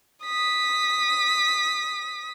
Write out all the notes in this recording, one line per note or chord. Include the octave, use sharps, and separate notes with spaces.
D#6 B6